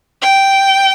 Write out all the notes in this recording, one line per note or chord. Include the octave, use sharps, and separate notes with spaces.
G5